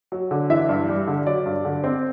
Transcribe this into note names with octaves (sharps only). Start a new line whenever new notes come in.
F#3
D3
E3 E5
G2
G3
D3
F#3 D5
G2
D3
C4